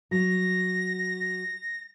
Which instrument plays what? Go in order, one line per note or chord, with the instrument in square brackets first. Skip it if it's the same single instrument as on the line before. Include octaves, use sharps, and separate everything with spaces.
[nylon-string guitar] F#3 [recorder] A#6